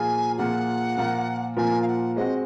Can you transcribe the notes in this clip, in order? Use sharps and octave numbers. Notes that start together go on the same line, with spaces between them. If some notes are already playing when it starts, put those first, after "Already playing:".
Already playing: A#2 F3 A#3 F4 G#4 G#5
A#2 F3 A#3 F4 G#4 F#5
A#2 F3 A#3 F4 A#4
A#2 F3 A#3 F4 A#4 G#5
F5
F#5
G#3 C4 F#4 D#5